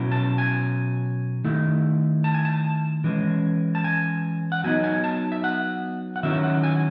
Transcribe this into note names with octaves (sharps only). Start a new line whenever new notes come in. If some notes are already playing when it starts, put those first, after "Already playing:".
Already playing: B2 F#3 C#4 E4
A5
G#5
D#3 A3 E4
A5
G#5
A5
E3 G#3 C#4
A5
G#5
F#5
F#3 B3 D#4 G#5
G#5
A5
E5
F#5
F#5
D#3 F#3 C#4 E4 E5
F#5
G#5